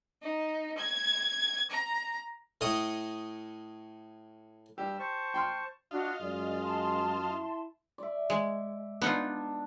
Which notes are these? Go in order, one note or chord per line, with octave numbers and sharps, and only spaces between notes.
D#4
G#6
A#5
A2 C#5 D#5 D#6
G2 G3 G4 E6
C5 A5 C#6
G5 C6 F6
D4 F4 F#4 D#5 F5
F#2 G#3 D5
A5 C6
E4
D5 E5
G#3
B3 D4 D#4 F4